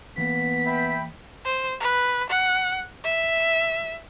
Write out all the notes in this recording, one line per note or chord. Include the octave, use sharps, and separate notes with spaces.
E3 A#3 B3 B6
E5 G5 B5
C5
B4
F#5
E5